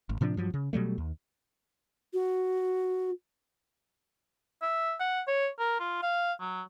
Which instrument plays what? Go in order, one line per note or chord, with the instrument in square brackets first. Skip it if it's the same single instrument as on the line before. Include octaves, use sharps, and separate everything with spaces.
[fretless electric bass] G#1
A2 C3 F3 D4
G2 F3 F#3
C#3
B2 F#3 G3 A3
D#2
[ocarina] F#4
[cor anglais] E5
F#5
C#5
A#4
F4
F5
F#3